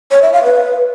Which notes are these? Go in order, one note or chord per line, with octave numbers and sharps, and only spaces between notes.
C#5
E5
F5
B4